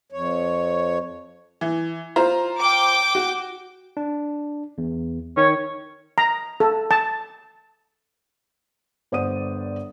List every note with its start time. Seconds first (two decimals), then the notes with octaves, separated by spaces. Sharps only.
0.12 F2 C#5
1.61 E3
2.16 F4 C5 A#5
2.59 G5 D6
3.15 F#4
3.97 D4
4.78 E2
5.37 D#3 C#5
6.18 A#5
6.60 A4
6.91 A5
9.12 G1 C5 D5 F#5 D#6 D#7